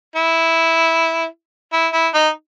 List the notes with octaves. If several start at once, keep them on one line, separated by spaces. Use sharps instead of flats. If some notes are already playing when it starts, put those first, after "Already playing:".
E4
E4
E4
D#4